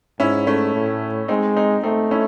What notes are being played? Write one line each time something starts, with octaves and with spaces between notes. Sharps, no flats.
G#2 C#4 E4
A3 C#4
A2
G#3 C4 D#4
C4 D#4
A3 C4 D#4
C#4 E4